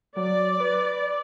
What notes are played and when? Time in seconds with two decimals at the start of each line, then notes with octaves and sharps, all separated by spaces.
0.16 F#3 D5
0.60 B4